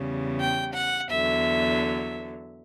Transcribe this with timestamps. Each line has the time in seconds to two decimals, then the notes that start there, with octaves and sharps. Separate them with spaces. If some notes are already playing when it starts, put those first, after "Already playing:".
Already playing: E2 C#3 G3
0.39 G5
0.74 F#5
1.11 E2 D3 F#3 E5